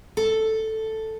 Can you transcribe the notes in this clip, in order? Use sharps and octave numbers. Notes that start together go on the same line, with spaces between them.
A4